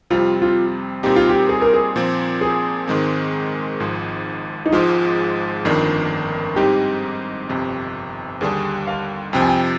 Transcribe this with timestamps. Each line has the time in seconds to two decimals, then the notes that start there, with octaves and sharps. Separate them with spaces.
0.10 F2 C3 G3 C4 F4
0.42 F4
1.03 A#2 G3 C4 D#4 G4
1.16 F4
1.29 G4
1.49 G#4
1.62 A#4
1.74 G#4
1.96 A#2 F3 C4
2.41 G#4
2.88 G#2 D#3 G#3 C4
3.80 G#1 G#2 F3
4.66 D#4
4.72 G#1 G#2 F3 G#3 F4
5.65 G1 F2 D#3 A#3 D4
6.56 G#2 G3 C4 D#4 G4
7.49 G1 F2 C3
8.41 D#2 D3 G3 D4 G#4
8.87 F5
9.33 F2 C3 F3 G5
9.42 G#5
9.49 G5